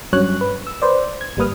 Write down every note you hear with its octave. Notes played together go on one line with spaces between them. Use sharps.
G2 F#3 C#4 C#5 F#6
B4
E6
B4 C5 D5
G#6
G1 G3 A#3 B4 D#6 F6